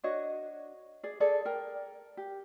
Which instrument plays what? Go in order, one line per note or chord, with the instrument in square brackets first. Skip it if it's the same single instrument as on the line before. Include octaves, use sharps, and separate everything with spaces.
[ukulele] D4 F#4 C#5 D#5
G#4 D5
G#4 A4 D5
A#4 G5
G4